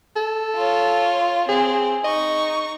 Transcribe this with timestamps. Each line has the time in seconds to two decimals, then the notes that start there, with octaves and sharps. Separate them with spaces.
0.16 A4
0.56 F4 C#5
1.49 C4 G#4
2.04 D#4 D#5 C#6